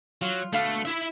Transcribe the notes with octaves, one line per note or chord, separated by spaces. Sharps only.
F#3 F4
B2 D3 A3 F5
E4 E5